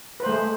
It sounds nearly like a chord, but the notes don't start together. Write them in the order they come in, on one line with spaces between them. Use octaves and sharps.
B4 C5 A3 G#3